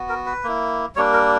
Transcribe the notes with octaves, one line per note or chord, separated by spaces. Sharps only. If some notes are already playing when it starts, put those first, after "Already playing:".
Already playing: B3 F#4
A#4
B4
A#3 E4
G3 A#3 D4 C#5
A#4